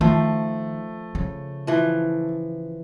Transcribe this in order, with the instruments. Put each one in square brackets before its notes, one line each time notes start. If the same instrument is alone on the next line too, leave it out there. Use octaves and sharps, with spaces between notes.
[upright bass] D#3 [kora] F3 [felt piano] A3
[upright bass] C#3
[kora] E3 F3